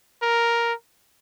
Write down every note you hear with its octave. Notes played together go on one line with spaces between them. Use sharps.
A#4